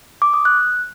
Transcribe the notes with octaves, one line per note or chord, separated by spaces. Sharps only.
D6
D#6
F#6